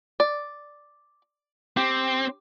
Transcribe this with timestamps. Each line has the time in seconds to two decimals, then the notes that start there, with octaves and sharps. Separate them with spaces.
0.20 D5
1.77 C4 G4